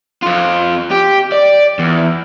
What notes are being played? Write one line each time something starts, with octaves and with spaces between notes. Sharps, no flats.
F2 F4
G4
D5
E2